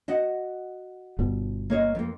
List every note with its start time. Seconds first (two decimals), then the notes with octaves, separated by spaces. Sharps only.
0.08 F#4 D#5 F#5
1.19 G1 G2 B2
1.70 A#3 C#5 D#5
1.95 F2 A#3